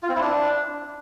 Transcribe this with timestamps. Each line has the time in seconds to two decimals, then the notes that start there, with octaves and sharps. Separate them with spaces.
0.03 F4
0.09 C4
0.15 E4
0.21 D4